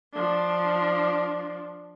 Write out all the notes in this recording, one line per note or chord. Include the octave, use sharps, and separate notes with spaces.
F3 D4